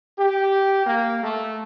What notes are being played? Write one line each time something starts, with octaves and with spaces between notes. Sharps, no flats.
G4
A#3
A3